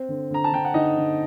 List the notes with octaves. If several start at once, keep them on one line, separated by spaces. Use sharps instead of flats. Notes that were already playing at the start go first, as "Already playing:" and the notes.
Already playing: C4
D3
D3 A#5
A5
D3 G5
F#5
D3 D#4 D#5
D3